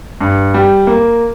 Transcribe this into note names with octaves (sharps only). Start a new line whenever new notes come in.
G2
G3
A#3